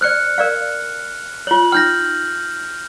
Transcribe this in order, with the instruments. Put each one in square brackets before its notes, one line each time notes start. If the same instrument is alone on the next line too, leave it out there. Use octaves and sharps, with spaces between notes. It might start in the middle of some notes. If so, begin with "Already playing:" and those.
[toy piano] C5 D5 [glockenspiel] F6 F#6 C#7
[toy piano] A#4 D5 F5
[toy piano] F4 C#5 [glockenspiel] F#7
[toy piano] D#4 G5 [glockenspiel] F6 G6 A#6